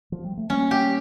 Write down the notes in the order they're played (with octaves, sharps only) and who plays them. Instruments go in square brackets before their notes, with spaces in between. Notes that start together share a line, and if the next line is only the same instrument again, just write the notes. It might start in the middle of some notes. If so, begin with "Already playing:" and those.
[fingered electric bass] F3
G3
A3
[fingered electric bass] G3 A#3 [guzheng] C#4
[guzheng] G4